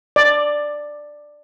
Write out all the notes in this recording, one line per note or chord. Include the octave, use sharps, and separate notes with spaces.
D5